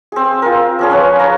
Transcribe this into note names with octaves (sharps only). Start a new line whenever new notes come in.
C4 G#4
F4 A#4
F3 C#4 G#4
C#4 B4 C#5
C#5 A#5